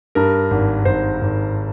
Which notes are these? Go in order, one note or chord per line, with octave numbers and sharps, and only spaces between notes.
G2 A#4
G#1
G#1 C5
G#1